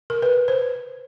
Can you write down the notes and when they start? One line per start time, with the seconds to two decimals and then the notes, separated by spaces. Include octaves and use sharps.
0.10 A#4
0.22 B4
0.48 C5